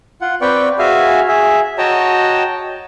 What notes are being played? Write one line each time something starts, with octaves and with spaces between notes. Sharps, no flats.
F4 F#5
C4 B4 D5 G5 C#6
F#4 G#4 E5 F5 G#5
G#4 E5
F#4 C#5 D#5 G5 A5 A#5